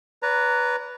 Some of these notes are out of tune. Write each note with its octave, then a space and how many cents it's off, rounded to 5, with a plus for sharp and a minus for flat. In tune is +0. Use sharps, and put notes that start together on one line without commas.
B4 +0 D5 -45 A#5 -10